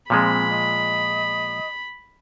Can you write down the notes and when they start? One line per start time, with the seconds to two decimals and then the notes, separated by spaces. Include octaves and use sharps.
0.10 A#2 F3 G#3 C4 B5
0.49 D#5